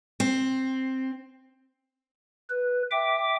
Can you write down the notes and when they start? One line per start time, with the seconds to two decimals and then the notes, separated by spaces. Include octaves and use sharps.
0.20 C4
2.50 B4
2.91 E5 G5 D6